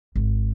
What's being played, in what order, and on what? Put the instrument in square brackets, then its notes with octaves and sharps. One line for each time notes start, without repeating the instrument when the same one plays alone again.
[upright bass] G#1